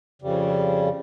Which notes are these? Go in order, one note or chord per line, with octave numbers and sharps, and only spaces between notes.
F2 C#3 G3